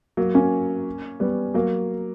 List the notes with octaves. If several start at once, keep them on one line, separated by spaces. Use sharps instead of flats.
F#3 A#3
A#3 C#4
G3 B3
F#3 A#3